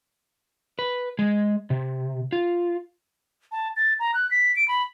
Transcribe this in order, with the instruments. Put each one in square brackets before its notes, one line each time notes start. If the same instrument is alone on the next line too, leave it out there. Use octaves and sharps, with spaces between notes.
[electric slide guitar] B4
G#3
C3
F4
[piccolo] A5
A6
A#5
F#6
B6
D7
B5